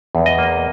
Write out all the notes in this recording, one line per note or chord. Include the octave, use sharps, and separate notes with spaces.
E2
D#5
A#3